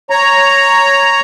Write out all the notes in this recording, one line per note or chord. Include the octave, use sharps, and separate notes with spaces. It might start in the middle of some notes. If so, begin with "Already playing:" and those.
C#5 A#5